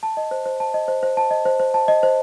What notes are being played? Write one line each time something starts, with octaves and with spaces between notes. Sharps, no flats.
A5
D#5
C5
C5
A5
D#5
C5
C5
A5
D#5
C5
C5
A5
D#5
C5